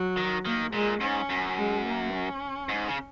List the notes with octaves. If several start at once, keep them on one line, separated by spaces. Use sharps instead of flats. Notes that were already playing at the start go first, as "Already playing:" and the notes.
Already playing: F#3
D#3
D#3 A#3
A#2 G#3
G#2 C#4
F#2
G#3
A#3
C#4
G#2
C#3